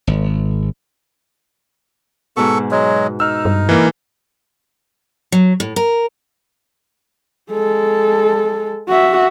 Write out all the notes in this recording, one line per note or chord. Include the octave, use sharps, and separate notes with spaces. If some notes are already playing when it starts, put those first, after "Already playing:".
G#1
G#2 B2 A4 C#6
F#3 G#3
D#4 E6 F6
G2
E3 A#3
F#3
A2
A#4
G#3 A4
F#4 E5